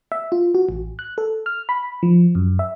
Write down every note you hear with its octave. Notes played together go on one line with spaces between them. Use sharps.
E5
F4
F#4
A1
F#6
A4
F6
B5
F3
F#2
E5